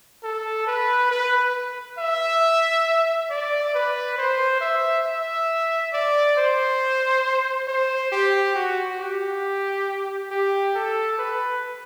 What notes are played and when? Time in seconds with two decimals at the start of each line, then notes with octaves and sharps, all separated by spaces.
0.24 A4
0.67 B4
1.11 B4
1.98 E5
3.30 D5
3.75 B4
4.18 C5
4.61 E5
5.05 E5
5.93 D5
6.37 C5
7.68 C5
8.12 G4
8.56 F#4
9.00 G4
10.31 G4
10.75 A4
11.19 B4